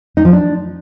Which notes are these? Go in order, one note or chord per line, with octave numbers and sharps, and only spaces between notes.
D#4
F3
D4